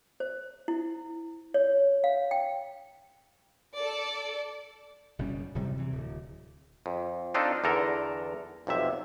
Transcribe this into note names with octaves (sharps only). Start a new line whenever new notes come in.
C5
E4
C#5
F5
G5
A4 D5
F#1 B2 G3 C#4
D1 C3 G3
C3 E3
D1
F2
C4 D4 D#4 F4 A4
E2 D3 A4 A#4 A#5
B1 F2 C3 E5